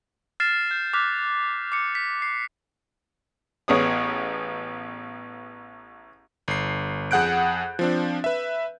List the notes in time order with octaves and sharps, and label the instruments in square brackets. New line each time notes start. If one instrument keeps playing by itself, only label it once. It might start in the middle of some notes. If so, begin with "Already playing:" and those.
[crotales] F6 A6 C7 E7
G6
D6 F6 F#6 B6
D6 C#7
B6
C7
[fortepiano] A1 B3 G#4 C#5 D#6
[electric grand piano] G1 C7
F2 G#4 F#5 F#6 G6 D7
F3 C4 D4
B4 E5